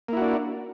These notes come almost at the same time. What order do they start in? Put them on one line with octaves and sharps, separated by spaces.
A#3 E4 F#4 D4